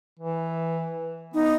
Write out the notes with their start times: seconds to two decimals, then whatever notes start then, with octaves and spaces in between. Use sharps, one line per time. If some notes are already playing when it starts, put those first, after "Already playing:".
0.19 E3
1.34 B3 D#4